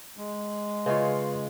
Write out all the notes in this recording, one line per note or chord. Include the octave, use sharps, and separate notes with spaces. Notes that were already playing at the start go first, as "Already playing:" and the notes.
G#3
C#3 F4 B4 C#5 D#5 C6